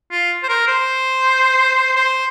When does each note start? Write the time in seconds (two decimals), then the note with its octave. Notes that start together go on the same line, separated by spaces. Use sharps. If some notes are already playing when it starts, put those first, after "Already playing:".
0.12 F4
0.43 C5
0.49 A#4
0.67 C5
1.96 C5